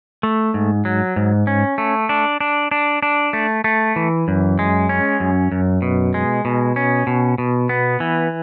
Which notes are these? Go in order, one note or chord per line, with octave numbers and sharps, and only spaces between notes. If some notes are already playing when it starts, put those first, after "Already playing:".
A3
G#2
F#3
G#2
C#4
A3
D4
D4
D4
D4
A3
A3
E3
F#2
G#3
C#4
F#2
F#2
B2
G#3
B2
C#4
B2
B2
B3
E3